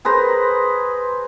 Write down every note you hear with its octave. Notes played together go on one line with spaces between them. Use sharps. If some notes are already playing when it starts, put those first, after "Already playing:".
G#4 B4 C5 A#5